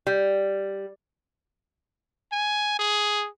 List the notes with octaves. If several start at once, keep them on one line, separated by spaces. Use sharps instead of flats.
G3
G#5
G#4